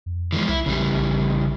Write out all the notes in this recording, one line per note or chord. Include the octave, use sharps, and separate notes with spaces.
F2
E3 F3 G#3
C2 E4
A#1 C#3 E3 G3